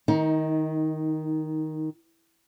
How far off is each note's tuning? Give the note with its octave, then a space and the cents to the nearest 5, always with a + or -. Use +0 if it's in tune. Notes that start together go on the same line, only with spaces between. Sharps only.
D#3 +5 D#4 +25